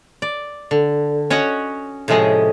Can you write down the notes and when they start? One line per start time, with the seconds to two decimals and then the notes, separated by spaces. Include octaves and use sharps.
0.22 D5
0.71 D3
1.30 C#4 F#4 C#5 D#5 F#5
2.08 A2 C3 F3 G#3 C#4 D#5